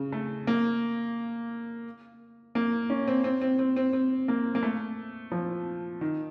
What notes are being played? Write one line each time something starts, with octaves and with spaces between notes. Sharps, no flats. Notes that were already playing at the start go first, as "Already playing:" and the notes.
Already playing: C#3
A3
A#3
A#3
C#4
C4
C4
C4
C4
C4
C4
A#3
A#3
A3
F3
D#3